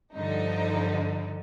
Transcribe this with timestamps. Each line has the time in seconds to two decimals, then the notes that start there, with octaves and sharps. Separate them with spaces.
0.14 G2 D3 F3 D#4